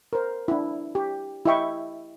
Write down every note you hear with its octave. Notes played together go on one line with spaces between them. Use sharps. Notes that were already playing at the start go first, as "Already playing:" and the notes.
A#4 C5
D4 E4
G4
E4 G4 D#5 E5 G5 C#6